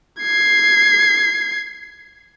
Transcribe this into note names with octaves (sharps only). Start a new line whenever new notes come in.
G#6 C7